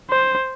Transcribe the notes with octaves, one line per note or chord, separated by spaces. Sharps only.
C5